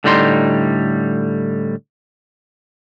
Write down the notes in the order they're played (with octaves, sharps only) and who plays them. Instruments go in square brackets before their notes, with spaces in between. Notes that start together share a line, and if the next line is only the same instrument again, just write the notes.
[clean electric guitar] A2 D3 G3 D#4 B5 C6